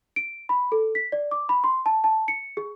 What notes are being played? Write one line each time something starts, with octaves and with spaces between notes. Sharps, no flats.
D7
B5
A4
B6
D5
D6
B5
C6
A5
A5
C#7
G#4